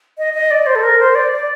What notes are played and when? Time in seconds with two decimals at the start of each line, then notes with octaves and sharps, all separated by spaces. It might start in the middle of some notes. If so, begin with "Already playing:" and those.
0.18 D#5
0.34 D#5
0.51 D5
0.67 C5
0.75 A4
0.83 A#4
0.99 C5
1.15 D5
1.32 D5